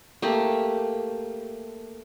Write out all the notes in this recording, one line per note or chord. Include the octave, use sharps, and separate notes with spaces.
A3 A#3 G4